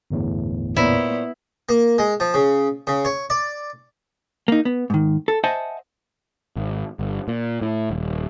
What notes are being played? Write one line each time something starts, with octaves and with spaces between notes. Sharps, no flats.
G1 E2 A2
A#2 B3 E4 C5 C#5
A#3
G#3
F3
C#3
C#3
C#5
D5
A#3 D#4
B3
G#2 D#3
A4
C5 D#5 E5 F#5 G#5 A5
G#1
G1
A#2
A2
D#1